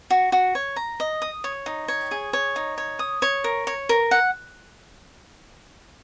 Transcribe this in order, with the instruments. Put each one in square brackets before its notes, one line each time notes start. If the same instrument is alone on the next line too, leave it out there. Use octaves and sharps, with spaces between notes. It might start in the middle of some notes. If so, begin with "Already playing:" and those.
[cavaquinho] F#4
F#4
C#5
A#5
D#5
D#6
C#5
D#4
C#5
G#4
C#5
D#4
C#5
D#6
C#5
A#4
C#5
A#4
F#5